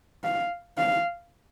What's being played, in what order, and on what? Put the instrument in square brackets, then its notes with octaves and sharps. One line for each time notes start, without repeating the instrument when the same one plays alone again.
[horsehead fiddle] F5
F5